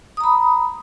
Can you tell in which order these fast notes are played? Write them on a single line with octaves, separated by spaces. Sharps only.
D#6 A#5 B5